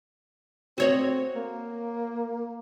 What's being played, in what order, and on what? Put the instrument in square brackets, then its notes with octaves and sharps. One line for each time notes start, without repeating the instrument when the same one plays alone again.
[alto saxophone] C4 [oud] F#4 C#5 D#5
[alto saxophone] A#3